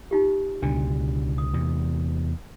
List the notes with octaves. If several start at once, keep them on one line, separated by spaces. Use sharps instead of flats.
D#4 F4 G4
C#2 B2 D3 D4
D#6
E2 C3